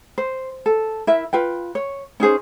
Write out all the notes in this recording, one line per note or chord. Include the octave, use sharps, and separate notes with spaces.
C5
A4
E4 A#4 E5
F4 B4 G5
C#5
C#4 D#4 G#4 C5